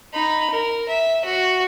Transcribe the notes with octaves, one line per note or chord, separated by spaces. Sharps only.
D#4 B5
A#4
E5
F#4